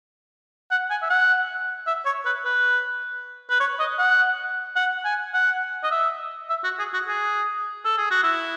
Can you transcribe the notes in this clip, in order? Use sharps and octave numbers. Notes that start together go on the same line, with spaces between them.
F#5
G#5
E5
F#5
E5
C#5
B4
B4
B4
C#5
D#5
F#5
F#5
G#5
F#5
D#5
E5
E5
F#4
G#4
F#4
G#4
A4
G#4
F#4
E4